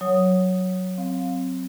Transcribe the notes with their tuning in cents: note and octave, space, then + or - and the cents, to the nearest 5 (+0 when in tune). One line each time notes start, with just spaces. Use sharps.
F#3 +0 C#5 +0 D#6 +0
C4 +5 F5 +10